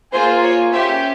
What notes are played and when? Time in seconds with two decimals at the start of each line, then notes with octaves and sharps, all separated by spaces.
0.13 A#3 F4 G#4 C5
0.43 C#5
0.73 C#4 G4 C5 E5